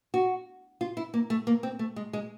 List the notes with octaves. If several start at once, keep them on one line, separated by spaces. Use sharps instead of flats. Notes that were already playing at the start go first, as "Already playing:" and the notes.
F#4
F4
E4
A#3
A3
A#3
C4
A3
G#3
G#3